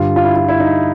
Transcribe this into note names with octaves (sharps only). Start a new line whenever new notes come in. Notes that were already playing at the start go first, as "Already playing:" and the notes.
Already playing: G2 D3 G3 F4
F4
E4
F4
E4
D#4